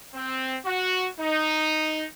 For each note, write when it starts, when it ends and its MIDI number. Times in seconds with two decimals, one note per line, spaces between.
0.14 0.56 60
0.65 1.07 66
1.19 2.04 63